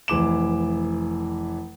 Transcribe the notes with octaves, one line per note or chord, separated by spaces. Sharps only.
F1 E3 D6 E7